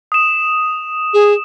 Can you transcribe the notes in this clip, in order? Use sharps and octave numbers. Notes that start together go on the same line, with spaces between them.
D#6 E7
G#4